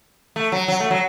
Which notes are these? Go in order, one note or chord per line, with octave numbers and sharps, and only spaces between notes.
A3
F#3
F#3
A3
F#3